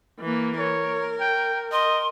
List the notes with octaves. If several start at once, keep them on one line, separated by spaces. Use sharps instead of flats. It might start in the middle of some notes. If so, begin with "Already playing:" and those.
E3 A#3
A#4 C#5
G5
D#5 C6